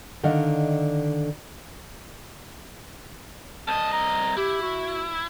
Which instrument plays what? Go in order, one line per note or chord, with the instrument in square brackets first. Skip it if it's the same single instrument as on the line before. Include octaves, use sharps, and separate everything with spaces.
[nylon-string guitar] D3 D#3 D5 D#5 F5 F#5
[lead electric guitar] C2 D#5 [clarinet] A5
[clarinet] A#5
[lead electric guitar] E4 [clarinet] G4
[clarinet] F#4